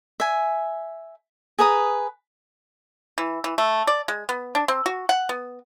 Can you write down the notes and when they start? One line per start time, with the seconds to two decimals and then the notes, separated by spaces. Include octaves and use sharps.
0.20 E5 G#5
1.59 G#4 B4 A#5 D#6
3.18 E3
3.44 E3
3.58 A3
3.87 D5
4.08 G#3
4.29 B3
4.55 D4
4.68 C4
4.86 F#4
5.09 F#5
5.29 B3